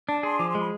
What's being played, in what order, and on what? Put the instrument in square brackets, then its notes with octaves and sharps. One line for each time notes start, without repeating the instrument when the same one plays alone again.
[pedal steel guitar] D4 [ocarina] A5
[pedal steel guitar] G#4 [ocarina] C6
[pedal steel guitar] F3 [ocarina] D6
[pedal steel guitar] G#3 [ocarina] C6
[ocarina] B5